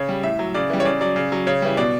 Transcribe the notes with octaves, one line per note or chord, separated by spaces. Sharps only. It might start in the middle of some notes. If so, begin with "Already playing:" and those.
Already playing: C#3 C#5
G3
A2 E5
F#3
C#3 D5
E3 G3
C#5
C#3 D5
F#3 D5
C#3
F#3
C#3 C#5
E3 G3
B2 D5